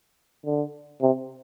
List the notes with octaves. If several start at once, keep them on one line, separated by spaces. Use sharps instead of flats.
D3
C3